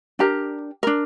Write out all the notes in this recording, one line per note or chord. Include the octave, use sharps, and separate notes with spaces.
D4 G4 A#4 A#5
D4 A#4